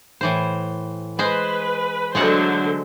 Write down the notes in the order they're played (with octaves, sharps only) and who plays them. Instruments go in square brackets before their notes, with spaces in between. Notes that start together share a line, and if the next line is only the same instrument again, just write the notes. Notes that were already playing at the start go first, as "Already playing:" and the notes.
[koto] A2 E3 C5
[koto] G#3 C5 [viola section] B4
[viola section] D3 F#3 C5 [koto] G#3 A3 F#5